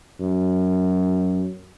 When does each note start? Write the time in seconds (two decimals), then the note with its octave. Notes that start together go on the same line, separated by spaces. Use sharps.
0.21 F#2